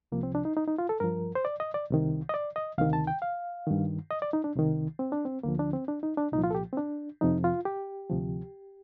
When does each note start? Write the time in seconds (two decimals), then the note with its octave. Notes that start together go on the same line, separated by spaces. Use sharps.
0.12 C2 C3 F3 A#3
0.23 C4
0.35 D4
0.45 D#4
0.57 D#4
0.67 D#4
0.78 F4
0.89 A4
1.00 G2 F3 A#4
1.35 C5
1.45 D5
1.60 D#5
1.74 D5
1.90 C2 C3 D#3
2.29 D#5
2.34 D5
2.56 D#5
2.78 D2 C3 D#3 F5
2.93 A5
3.07 G5
3.22 F5
3.67 G2 D#3
4.11 D#5
4.22 D5
4.33 D#4
4.44 D4
4.55 C2 C3 D#3
4.99 C4
5.12 D4
5.25 C4
5.43 D2 D3 F3 A#3
5.59 D4
5.73 C4
5.88 D4
6.03 D#4
6.17 D4
6.33 C2 A#2 F3 D#4
6.44 F4
6.50 A4
6.55 G4
6.73 C4
6.77 D4
7.21 F2 C3 F3 D#4
7.44 F4
7.65 G4
8.10 D2 C3 F3